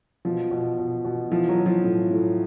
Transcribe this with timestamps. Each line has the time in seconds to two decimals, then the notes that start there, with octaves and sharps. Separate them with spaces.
0.25 B2 F3
0.51 B2
0.78 B2
1.05 B2
1.31 E3 F3
1.49 F#3
1.57 E3
1.66 F3
1.84 A2
2.11 A2